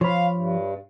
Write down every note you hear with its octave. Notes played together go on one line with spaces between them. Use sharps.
F3 C#5 F5 B5
G2